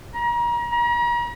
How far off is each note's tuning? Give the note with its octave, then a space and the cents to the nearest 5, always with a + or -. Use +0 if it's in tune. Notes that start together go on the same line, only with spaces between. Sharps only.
A#5 +35
A#5 +40